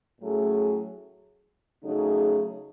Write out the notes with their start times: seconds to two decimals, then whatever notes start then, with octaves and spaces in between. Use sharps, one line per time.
0.21 A2 F#3 A3 C#4 G#4
1.83 C#3 F#3 A3 D#4 G#4